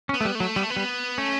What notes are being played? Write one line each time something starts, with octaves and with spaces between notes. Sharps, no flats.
C#4
B3
A3
G3
A3
F#3
G3 B3
A3
B3
G3
A3 C#4